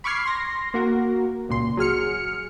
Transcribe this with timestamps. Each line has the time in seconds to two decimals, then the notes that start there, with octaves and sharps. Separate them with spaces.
0.04 B5 C#6 D6 F6 G#6 C7
0.25 C6 A#6
0.74 A#3 F#4 A#4
1.49 C#2 A#2 C6
1.77 F#3 G#4 F6 C#7